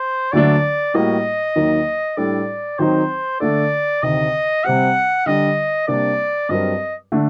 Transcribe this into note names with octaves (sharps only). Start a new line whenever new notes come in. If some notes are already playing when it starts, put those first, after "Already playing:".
Already playing: C5
D2 D3 F#3 A3 D4 D5
A2 G3 A#3 F#4 D#5
D#2 D#3 F#3 A#3 D#4
A2 G3 D4 A4 D5
D#3 F#3 C4 D#4 C5
D3 A3 D4 A4 D5
D2 C3 D#3 D#5
C3 G3 C4 G4 F#5
D3 G3 D4 D#5
C3 G3 A#3 D4 D5
G2 F#3 C4 G4 A#4 D#5
D3 A3 D4